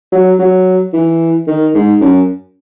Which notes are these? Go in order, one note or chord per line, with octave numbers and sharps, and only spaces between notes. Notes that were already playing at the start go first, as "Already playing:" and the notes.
F#3
F#3
E3
D#3
G#2
F#2